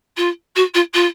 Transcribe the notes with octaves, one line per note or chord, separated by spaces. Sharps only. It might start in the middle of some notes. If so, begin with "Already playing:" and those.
F4
F#4
F4
F4